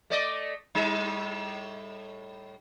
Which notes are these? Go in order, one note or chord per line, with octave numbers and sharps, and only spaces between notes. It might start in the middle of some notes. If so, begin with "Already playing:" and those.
A3 D5 D#5
A2 G3 D#4